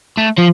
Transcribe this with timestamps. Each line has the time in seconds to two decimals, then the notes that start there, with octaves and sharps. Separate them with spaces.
0.17 A3
0.38 F3